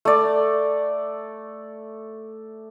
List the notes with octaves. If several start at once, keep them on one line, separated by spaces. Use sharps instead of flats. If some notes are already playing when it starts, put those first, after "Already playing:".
A3 D5